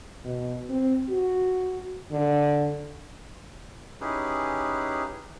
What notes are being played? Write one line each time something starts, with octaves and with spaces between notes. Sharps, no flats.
B2
C4
F#4
D3
C#4 D#4 E4 G4 G#4 B4